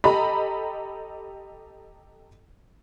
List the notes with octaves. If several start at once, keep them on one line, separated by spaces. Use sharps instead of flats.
G4 A4 D#5 A#5 B5